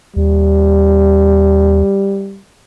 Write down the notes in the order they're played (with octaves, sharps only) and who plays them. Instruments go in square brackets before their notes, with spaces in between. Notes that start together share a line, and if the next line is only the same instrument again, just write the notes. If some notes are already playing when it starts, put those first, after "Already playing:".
[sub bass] D#2 [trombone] G3